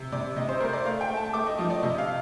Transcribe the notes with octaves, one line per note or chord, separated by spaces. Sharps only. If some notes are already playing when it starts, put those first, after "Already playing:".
Already playing: C3
C3 D5
C3 D#5
C5
A3 A#4
D5
A3 F5
G5
A3
A5
A3 D6
D#5
F3 D#5
D5
C3 D#5
F5